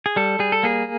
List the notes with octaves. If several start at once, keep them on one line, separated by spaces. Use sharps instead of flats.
G#4
G3 A4
G3 G#4
A4
A#3 G#4